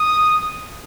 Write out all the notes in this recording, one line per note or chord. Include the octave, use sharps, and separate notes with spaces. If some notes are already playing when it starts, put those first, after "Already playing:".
Already playing: D#6